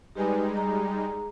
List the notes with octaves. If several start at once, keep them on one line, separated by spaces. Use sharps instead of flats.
G3 G#3 D#4 G4 B4 G#5
G#4 A#5